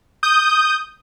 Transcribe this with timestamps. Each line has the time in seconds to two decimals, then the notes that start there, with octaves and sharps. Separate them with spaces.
0.23 D#6 G6